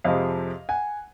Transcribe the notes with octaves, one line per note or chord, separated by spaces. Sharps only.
F2 C3 F3 G#3 D#5 F5
F#5 G#5